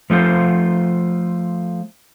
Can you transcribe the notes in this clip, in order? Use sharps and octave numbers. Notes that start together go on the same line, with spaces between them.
F3 A3 F4 C5